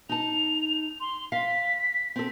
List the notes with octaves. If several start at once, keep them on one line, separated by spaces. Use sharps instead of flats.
D#4 A5 F7
C6
F5 B6
C4 A4